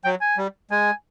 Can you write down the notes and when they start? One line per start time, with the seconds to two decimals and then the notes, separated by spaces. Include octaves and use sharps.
0.05 F#3 G5
0.21 G#5
0.37 G3
0.71 G#3 G#5